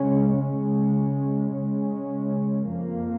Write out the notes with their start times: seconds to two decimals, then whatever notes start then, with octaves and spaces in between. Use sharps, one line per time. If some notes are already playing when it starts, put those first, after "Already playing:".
Already playing: C#3 G#3 C#4
0.36 C#3 G#3 C#4
1.52 C#3 G#3 C#4
2.67 F2 F3 A#3